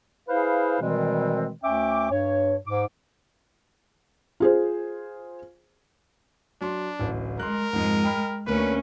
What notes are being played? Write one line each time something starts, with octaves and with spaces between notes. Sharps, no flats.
E4 G#4 B4 C5 F5
B2 D#3 E3 G3 G#3 C4
D2 C#4 E5 G5 D6
G2 C#5
G#2 D6
F4 G#4 C5
F#3 D4 C6
D1 A1
G#3 A#4 C6 F#6
F2 G#2 G#3
G5 B5 F6
D2 A#3 C#4 A#4 B4